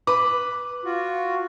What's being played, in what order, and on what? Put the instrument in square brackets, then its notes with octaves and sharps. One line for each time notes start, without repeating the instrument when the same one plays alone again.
[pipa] B4 [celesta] D6
[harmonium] F4 F#4